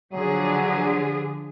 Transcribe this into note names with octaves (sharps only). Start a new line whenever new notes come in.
D3 F3 F#3 G#4